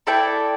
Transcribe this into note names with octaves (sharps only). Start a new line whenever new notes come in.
E4 A4 D5 G5